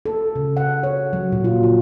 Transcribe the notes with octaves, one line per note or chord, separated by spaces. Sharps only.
A4
C#3
F#5
C#5
F#3
A#2
F4
F4